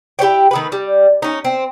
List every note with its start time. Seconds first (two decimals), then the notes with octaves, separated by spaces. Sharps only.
0.19 E4 G4 C#5 G5
0.51 D#3 A3 B4
0.72 G3
1.22 C#4 D#4
1.45 C4